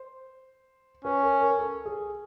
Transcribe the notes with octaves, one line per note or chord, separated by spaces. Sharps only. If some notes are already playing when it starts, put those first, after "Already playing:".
Already playing: C5
C#4 B4
A#4
A#4
A4
G#4